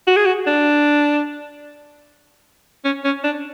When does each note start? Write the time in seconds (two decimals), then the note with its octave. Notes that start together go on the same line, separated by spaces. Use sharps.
0.07 F#4
0.16 G#4
0.26 F#4
0.47 D4
2.85 C#4
3.04 C#4
3.24 D4